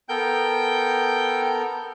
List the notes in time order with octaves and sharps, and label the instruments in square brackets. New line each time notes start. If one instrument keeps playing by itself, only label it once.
[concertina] B3 A4 A#4 [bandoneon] G5 G6